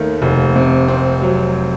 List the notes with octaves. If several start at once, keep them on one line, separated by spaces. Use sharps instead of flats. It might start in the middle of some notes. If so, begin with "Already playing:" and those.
Already playing: D#2 D#3 A3
F1
C3
C4
F#3